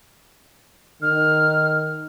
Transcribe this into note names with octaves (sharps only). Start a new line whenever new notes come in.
D#3 F6